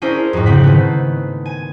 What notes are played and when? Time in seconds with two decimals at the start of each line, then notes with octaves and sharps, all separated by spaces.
0.02 C#4 D4 E4 G#4 A#4 C5
0.33 F2 G#2
0.46 C#3 C4 F#5 B6
0.63 D#3 A3 B3
1.46 G#5